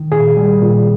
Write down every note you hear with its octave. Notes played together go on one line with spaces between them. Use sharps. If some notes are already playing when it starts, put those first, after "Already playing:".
Already playing: D#3
A#2 G#4
G3
A#2